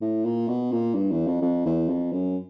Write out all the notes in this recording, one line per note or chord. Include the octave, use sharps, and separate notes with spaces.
A2
A#2
B2
A#2
G2
E2
F2
F2
E2
F2
F#2